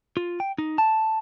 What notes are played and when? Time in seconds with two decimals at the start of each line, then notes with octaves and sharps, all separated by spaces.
0.17 F4
0.40 G5
0.58 D#4
0.78 A5